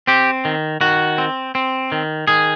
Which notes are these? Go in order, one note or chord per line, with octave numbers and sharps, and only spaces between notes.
C4 G4
D#3
D#3 F#4
C4
C4
D#3
D#3 G#4